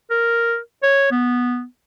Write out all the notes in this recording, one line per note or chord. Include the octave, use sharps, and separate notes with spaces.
A#4
C#5
B3